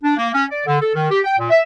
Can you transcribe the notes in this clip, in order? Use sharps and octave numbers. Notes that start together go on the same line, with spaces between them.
D4
A#3
C#4
D5
D3
A4
D#3
G4
G5
A#2
E5